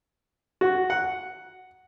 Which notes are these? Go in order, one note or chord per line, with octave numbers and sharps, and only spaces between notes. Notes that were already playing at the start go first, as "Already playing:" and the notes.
F#4
F#5